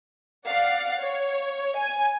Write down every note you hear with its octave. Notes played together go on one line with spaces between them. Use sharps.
D5 F5 F#5
C#5
G#5